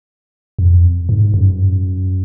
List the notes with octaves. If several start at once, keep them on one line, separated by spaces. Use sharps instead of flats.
F2
G#2
F#2